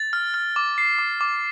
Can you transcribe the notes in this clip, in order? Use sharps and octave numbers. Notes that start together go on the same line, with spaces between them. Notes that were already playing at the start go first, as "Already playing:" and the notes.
Already playing: A6
F6
F6
D6
C7
D6
D6